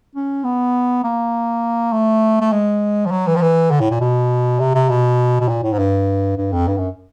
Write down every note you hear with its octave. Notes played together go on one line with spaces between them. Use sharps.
C#4
B3
A#3
A3
A3
G#3
F3
F#3
E3
F3
E3
D3
A2
A#2
B2
C3
C3
B2
B2
A#2
A2
G#2
G2
G2
F2
G2
F#2